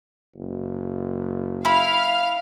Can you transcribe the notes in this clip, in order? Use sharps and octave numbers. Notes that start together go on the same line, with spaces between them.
F#1
E4 F5 B5 F6